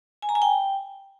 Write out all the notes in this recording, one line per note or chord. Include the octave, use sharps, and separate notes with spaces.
G#5
A#5
G#5
G5